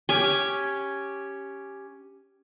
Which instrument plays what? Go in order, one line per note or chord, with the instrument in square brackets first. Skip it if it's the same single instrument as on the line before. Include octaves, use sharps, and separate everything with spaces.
[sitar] C#4 G4 [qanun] G#5